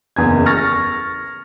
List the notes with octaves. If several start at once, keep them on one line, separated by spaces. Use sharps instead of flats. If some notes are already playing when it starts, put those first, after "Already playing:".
F#1 E2 G#5 G#6
C#6 F6 A6 A#6